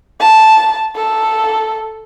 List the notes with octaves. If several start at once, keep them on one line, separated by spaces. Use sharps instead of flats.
A5
A4